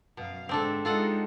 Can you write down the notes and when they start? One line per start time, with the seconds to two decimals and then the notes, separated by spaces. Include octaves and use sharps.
0.17 F#2 B2 F5
0.49 G#2 D3 C4 D4 A4
0.85 G#3 D#4 F4 A4 F#5